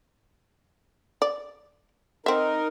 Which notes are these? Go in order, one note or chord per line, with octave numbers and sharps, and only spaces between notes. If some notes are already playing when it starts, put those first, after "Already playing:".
D5
C4 D#4 A#4 E5